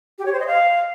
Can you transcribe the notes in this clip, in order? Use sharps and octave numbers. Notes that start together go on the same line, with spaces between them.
G4
C#5
C5
D#5
F5